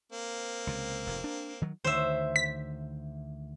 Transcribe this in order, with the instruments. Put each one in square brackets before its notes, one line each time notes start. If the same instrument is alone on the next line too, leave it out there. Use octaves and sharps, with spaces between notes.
[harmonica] A#3 C4
[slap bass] C#2 C3
F1 G#2
D4
D#3 F#3
[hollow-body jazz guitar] D2 D#3 C#5 [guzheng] C5 E5
[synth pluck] B6